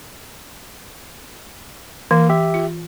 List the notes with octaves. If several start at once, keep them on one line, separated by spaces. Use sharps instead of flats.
E3 A#3
G4 E5
F4